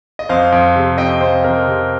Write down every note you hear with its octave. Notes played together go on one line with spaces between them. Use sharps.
D#5
F2 C5 F5
F2
C3
F2 D#5 G5
F2 C5 F5
F2 A#4 D#5
C3